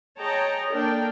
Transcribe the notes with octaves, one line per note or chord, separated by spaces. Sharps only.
G#4 C#5 D#5 G5 A5 A#5
A#3 D4 A4 A#4 D5 G5